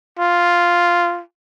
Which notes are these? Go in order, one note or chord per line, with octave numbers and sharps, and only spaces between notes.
F4